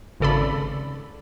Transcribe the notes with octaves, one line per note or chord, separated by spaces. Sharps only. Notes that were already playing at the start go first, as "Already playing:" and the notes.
G#1 C#3 A4 D5 B5